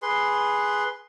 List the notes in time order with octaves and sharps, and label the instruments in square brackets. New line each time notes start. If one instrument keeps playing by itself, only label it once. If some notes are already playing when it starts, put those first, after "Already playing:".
[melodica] G#4 B4 C6